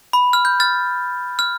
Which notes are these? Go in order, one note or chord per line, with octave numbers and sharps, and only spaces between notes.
B5
F6
G6
F6 A6
F6